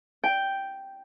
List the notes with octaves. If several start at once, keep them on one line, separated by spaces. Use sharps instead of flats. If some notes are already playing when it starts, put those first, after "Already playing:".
G5